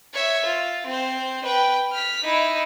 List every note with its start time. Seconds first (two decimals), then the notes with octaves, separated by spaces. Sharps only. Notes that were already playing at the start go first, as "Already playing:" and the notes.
0.14 C#5 E5
0.45 F4
0.87 C4 C5
1.44 B4 G5
1.92 F6 B6
2.24 D#4 E4